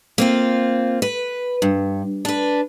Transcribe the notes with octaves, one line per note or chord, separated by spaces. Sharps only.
A#3 C4 F4
B4
G2
D4 B4